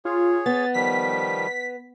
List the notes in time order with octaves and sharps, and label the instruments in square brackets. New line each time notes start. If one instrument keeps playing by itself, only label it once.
[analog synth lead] F4 [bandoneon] G#4 C#5
[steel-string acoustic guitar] B3 [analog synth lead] A6
[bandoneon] D#3 F3 G3 [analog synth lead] B6